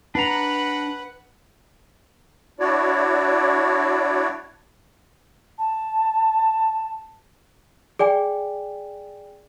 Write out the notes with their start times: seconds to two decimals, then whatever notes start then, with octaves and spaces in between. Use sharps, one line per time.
0.15 D4 B4 F#5 A#5
2.60 D4 E4 F#4 C#5 D5
5.58 A5
7.99 G#4 D5 G5 G#5